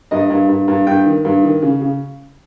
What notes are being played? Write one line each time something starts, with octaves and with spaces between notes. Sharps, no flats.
G2 D#5
G2
G2
G2
G2 G5
D#3
G2
D#3
C#3
C#3